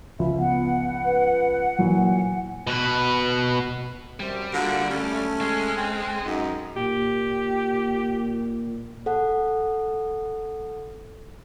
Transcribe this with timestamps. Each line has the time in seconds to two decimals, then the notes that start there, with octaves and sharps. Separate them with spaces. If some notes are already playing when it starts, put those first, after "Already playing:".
0.19 C#2 F3 E5
0.38 B3 F#5
1.05 B4
1.79 A#2 E3 F#3 G#5
2.67 B2 B4
4.20 F#2 G3 C4
4.53 D3 A#3 F4 F#4
4.90 A3 C#4
5.41 G#3
5.77 C4
6.26 F#2 G#3 D#4
6.76 A#2 G4
9.06 A4 F#5